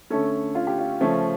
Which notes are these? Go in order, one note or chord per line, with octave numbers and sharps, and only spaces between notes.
D3 A3 C#4 A4
F4
G4
F4
C#3 F3 A3 C#4